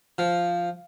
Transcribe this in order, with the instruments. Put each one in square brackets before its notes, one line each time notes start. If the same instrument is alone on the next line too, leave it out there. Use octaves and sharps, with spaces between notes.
[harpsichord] F3